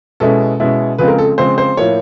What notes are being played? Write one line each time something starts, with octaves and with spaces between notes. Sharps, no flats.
B2 G#3 C#4 E4 A4
B2 G#3 C#4 E4
C#3 F3 G#3 C4 B4
A#4
A4
C#3 F3 G#3 C4 C5
C5
A2 F3 A#3 C#5